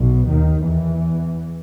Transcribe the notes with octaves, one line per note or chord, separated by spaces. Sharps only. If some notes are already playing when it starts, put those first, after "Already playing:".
Already playing: B1 B2
D#2 D#3
E2 E3